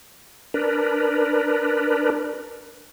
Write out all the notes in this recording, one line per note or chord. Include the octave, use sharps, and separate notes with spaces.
D4 A#4 B4